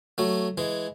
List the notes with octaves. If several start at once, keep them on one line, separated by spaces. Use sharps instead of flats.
F#3 A3
E3 G#3